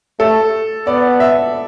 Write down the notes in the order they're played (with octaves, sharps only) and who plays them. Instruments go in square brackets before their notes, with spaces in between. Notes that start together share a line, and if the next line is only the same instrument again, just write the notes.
[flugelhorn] A3 [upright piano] A4
[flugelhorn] B3 [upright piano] D5
[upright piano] E5